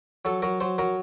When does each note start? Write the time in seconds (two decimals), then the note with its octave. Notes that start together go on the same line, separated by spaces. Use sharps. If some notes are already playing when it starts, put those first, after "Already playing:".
0.25 F#3 A4
0.42 F#3 A#4
0.60 F#3 C5
0.78 F#3 A#4